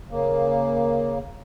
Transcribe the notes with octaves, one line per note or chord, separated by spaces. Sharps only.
C#3 A#3